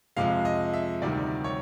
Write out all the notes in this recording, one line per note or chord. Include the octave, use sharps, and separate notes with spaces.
F2 C3 F3 G#3 F5
D#5
E5
D2 C3 D#3 G3 D5
C#5